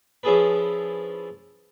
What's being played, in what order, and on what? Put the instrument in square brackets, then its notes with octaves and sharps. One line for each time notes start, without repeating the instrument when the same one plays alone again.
[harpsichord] F3 C#4 E4 G#4 A4 B4